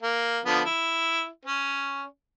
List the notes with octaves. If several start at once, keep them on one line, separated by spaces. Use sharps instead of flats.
A#3
D3 F3 B3
E4
C#4